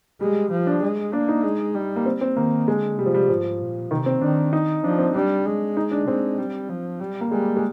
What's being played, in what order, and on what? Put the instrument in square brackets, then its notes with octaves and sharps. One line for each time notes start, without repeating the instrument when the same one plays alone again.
[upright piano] G3 [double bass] G#3
[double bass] F3
[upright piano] D4
[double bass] G#3
[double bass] A#3 [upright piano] D4
[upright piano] D#4
[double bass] G#3
G3
[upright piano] A#3
C4
C4
[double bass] D#3 [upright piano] A#3
[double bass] D3 [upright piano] G#3
[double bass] C3 [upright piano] G3
[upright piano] F3
G3
[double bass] G#2 [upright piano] F3
[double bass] A#2
[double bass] C3 [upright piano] D#3
[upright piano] C4
[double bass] D#3 [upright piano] D4
[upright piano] D#4
[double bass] F3 [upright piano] D4
[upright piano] C4
[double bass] G3 [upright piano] D4
[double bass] G#3
[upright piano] D#4
D4
[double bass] G#3 [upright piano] C4
[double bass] G3
F3
G3
[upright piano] A#3
[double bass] G3 [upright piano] G#3
[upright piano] G#3